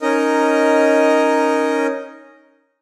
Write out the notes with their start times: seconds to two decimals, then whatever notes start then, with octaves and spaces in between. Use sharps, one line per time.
0.01 C#4 D#4 A#4 D#5